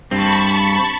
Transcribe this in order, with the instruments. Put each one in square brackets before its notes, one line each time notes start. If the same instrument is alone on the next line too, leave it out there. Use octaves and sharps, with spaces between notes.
[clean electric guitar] G2 C4 [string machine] A5 B5 C#6